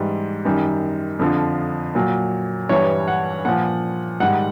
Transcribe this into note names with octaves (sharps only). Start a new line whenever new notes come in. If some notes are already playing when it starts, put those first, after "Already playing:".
Already playing: G#2 E3 G3
F#2 D#3 G3
F2 D3 F3
A#2 F#3
G2 E3 G3 C#5
F#5
A#2 F3 F#5
G#2 D#3 G3 F#5